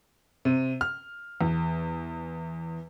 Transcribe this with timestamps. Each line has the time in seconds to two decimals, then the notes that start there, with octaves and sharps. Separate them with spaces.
0.45 C3
0.81 F6
1.41 E2